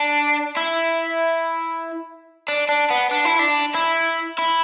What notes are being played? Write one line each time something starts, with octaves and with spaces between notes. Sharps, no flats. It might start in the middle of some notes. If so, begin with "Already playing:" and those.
Already playing: D4
E4
D4
D4
B3
D4
E4
D4
E4
E4